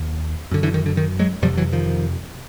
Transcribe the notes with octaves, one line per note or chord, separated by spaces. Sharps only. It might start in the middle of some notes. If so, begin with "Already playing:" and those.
Already playing: D#2
F#2 D3
D3 E3
D#3
D3
D#3
F#3 G#3
F2 C3 F3 G3
E3 F#3
D#3 F3